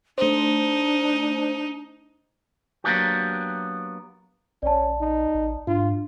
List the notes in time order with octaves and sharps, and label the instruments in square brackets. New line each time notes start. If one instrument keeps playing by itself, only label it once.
[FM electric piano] A3 C5 [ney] D4 [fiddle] D#4
[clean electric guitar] F#3 A#3 B3 D4 F#4 G4
[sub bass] A#1 [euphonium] C#4 [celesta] D5 A5
[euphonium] D#4
[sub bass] A1
[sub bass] G#2 [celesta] D4 [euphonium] F4